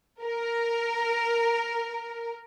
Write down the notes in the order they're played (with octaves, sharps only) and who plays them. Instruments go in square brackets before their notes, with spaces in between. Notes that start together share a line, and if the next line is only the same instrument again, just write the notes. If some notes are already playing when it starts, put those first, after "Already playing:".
[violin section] A#4